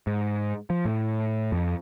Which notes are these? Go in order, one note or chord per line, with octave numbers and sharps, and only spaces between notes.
G#2
F3
A2
F2